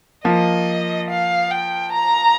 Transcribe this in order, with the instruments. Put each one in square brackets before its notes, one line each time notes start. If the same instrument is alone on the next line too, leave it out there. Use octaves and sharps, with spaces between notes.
[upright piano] F3 A#3 [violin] D#5
[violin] F5
G5
A#5